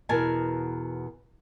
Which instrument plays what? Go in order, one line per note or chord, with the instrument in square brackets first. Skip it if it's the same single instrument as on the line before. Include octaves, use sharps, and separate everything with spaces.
[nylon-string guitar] E2 B2 A#4 G#5 A5